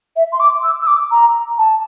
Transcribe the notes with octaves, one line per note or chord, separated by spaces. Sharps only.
E5
C6
D6
E6
E6
D6
A#5
A5